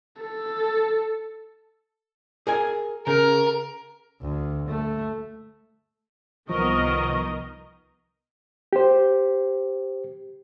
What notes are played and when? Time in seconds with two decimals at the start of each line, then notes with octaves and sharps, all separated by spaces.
0.22 A4
2.47 G#4 A#4 G#5
3.07 C#3 A#4
4.22 D2
4.68 A3
6.50 C2 D#3 F3 B3 A#4 D#5 C#6
8.73 G4 C5